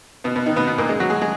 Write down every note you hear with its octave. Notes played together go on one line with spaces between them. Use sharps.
B2 B3
B2 B3
D#3 D#4
B2 B3
B2 B3
A#2 A#3
G#3
F#3 F#4
G#3 G#4
G#3 G#4